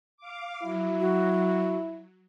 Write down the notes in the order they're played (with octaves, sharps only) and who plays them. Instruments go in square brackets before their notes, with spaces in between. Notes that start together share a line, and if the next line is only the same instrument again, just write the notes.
[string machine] F5 D6
[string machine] F#3 [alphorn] E4
[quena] F#4